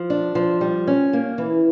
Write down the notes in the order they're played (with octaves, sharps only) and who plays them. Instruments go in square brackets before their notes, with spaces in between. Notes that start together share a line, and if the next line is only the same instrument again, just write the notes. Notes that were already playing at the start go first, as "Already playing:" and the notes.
Already playing: [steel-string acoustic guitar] F3
D4
F3
G3
C#4
A#3
E3